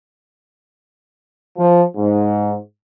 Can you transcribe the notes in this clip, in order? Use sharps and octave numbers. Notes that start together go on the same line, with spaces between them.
F3
G#2